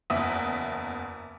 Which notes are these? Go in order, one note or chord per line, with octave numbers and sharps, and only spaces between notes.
F#1 E2 E5 D#6